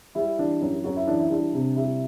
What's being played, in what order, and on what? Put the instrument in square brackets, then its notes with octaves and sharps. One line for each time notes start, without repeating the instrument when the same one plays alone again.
[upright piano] G3 E4
E3 D4
F#2
F#2 F#4
E4
E3 D4
E4
G3 D4
C3
G3 E4